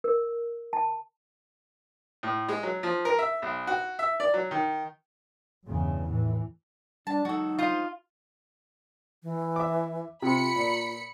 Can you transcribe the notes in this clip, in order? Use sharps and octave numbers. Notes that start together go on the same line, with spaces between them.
A#4
A5
A2
G#3
F#3
F3
A#4
E5
B1
F#4
E5
D5
F#3
D#3
E2 G2 C#3
A2 E3
G3 D4 A5
F#3 G#3 D#4 F#4 A4 F#5
F4 C5 D#6
E3
E5 D6
C3 F4 B5 C#7
A#2